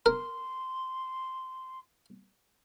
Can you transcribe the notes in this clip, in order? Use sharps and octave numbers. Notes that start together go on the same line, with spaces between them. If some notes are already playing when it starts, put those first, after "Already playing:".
A#4 C6